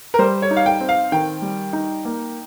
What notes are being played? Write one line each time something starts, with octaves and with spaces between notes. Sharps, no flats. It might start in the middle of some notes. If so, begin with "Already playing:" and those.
A#4
G3 C5
C#5
D#4
F5
G5
C4
F5
D#3 G5
G3
D#4
A#3